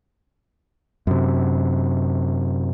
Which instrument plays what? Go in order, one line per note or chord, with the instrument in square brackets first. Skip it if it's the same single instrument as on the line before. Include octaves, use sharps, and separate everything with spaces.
[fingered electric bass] F#2 C3